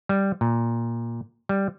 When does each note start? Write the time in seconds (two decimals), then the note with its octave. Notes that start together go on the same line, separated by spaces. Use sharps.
0.09 G3
0.41 A#2
1.49 G3